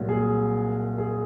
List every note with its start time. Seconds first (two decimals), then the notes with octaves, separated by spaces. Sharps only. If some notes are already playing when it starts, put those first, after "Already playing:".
Already playing: C2 A#2 F#3
0.09 G#4
0.98 G#4